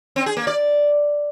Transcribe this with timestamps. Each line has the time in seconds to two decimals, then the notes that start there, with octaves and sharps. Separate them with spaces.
0.16 C4
0.26 G#4
0.37 A#3
0.47 D5